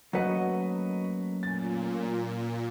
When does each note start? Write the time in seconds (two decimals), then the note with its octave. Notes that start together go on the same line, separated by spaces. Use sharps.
0.13 F#3 A3 A#3 C#4 F#4 B4 D#5 F#5
1.43 A#2 G#5 A6